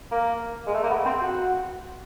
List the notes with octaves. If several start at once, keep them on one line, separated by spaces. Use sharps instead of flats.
A#3
G#3
A3
A#3
B3
C4
F#4